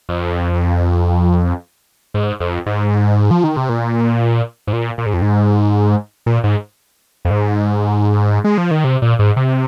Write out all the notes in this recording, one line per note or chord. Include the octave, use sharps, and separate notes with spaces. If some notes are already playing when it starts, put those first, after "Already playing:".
F2
G#2
F2
G#2
F3
D#3
C3
A#2
G#2
A#2
A#2
G#2
F2
G#2
A#2
G#2
F2
G#2
G#3
F3
D#3
C3
A#2
G#2
C3